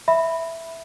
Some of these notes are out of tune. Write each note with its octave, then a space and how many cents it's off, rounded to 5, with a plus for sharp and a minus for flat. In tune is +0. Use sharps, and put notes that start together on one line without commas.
E5 +0 B5 +0